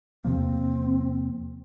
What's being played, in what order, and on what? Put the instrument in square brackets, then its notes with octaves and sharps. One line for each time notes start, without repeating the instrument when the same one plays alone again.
[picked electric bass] E2 C3 F3 A#3 [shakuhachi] C4